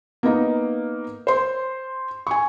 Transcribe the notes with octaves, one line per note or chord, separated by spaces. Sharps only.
A#3 B3 D#4 A#5
C5 C6
G#5 C#6